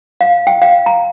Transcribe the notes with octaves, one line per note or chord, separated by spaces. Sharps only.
F5
G5
F5
A#5